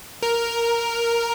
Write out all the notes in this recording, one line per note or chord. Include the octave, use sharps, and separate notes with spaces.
A#4